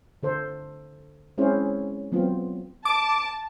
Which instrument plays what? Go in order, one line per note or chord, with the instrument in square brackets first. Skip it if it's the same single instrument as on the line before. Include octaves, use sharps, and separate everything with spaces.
[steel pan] D3 A4 C5
G#3 C4 C#4 E4 G#4 C5
F#3 B3 C4 F4
[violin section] A5 [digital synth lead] D6